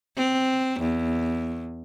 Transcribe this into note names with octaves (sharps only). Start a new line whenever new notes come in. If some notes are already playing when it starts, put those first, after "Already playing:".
C4
E2